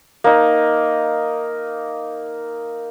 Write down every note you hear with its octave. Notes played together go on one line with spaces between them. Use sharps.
A#3 D#4